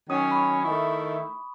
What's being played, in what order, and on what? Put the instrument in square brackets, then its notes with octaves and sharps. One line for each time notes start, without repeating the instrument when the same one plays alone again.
[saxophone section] D#3 F#3 C#4 [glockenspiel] D#6
[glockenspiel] B5
C#6
[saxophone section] D#3 A3 E4 [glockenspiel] C#6